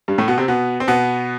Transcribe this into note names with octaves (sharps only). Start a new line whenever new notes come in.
G2 G3
A2 A3
B2 B3
C3 C4
B2 B3
C4
B2 B3